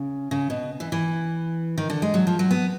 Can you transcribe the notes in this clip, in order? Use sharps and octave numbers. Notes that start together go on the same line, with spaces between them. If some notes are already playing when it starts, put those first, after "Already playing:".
Already playing: C#3
C#3
B2
E3
E3
D#3
D3
G#3
F#3
F3
F#3
B3